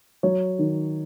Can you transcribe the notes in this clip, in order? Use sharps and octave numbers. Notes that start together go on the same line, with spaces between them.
F#3 C#5
D#3